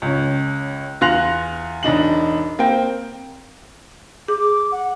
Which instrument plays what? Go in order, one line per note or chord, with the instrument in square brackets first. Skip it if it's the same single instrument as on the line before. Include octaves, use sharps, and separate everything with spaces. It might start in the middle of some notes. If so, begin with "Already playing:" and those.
[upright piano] C#2 C#4
E2 F4 C6 F#6 A#6 F7
E1 D4 D#4 F#7
A#3 C4 G5
[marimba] G#4 [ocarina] D6
[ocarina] F#5